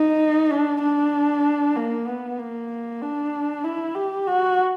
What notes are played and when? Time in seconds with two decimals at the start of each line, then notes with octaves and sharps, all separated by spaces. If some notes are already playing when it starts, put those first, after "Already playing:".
Already playing: D#4
0.51 D4
0.83 D4
1.76 A#3
2.07 B3
2.39 A#3
3.01 D4
3.64 E4
3.95 G4
4.27 F#4